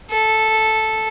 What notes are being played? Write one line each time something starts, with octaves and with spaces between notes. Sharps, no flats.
A4